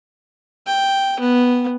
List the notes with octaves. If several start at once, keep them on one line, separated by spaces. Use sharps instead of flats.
G5
B3